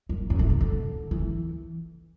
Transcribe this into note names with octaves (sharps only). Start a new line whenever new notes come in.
F#2
F#2
A2
B2
D3
E3